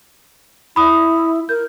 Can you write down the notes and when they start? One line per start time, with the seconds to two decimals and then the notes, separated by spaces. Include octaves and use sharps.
0.76 E4 B5 D#6
1.49 A#4 G6